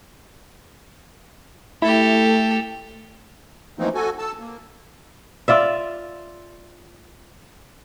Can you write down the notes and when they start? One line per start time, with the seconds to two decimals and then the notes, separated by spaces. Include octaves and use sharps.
1.82 A3 E4 G4 A4
3.79 E3 F3 A3 A#3 C4 D#4
3.95 F#4 A4 G#5
4.18 A4 A5 E6
4.40 A#3
5.48 F4 D5 E5